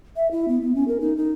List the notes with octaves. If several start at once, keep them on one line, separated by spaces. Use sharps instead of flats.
E5
E4
B3
B3
C#4
A#4
D#4
D#4